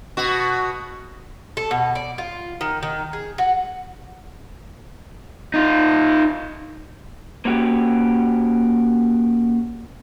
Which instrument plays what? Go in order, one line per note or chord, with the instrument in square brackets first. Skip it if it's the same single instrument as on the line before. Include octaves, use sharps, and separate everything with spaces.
[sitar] B2 F#4
[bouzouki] A4
B2
D5
F4
D#3
D#3
G#4
F#4
[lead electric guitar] D#4 F4
[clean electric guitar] A#3 C#4 F#4 G4